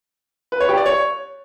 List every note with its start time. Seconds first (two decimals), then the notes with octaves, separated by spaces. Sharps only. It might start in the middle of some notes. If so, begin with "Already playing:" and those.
0.52 B4
0.60 C#5
0.69 G4
0.77 D5
0.86 C#5